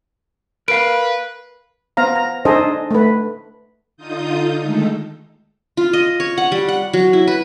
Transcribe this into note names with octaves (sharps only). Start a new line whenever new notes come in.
A#4 B4 F5 D7
B3 C5 F5 A#5
A#5
D4 D#4 G#4 A4 C5 D#5
A3 B4
D3 D#4 F4 D#6 G6
D#3 G#3 A3 A4
F4
D#5
C#5
F#5
G3
F#5
F#3
E4
B4